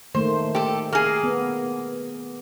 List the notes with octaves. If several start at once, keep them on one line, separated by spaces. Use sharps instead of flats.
D#3 A3 A#3 C5
G4 A4
A#3 G#4
B3